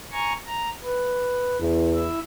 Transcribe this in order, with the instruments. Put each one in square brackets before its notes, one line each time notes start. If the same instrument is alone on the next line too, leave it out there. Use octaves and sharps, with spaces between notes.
[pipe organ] G#5 A#5 C#6
A#5
B4
[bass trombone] E2
[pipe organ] E4 E5